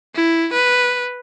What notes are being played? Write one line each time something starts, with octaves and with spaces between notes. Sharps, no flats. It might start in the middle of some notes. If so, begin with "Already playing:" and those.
E4
B4